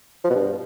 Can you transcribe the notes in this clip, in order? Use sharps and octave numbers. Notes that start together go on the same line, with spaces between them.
F3
B2
G2